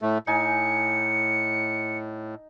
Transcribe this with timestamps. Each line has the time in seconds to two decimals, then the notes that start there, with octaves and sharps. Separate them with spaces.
0.02 A2 A3
0.27 A2 D#4 G#5 C#7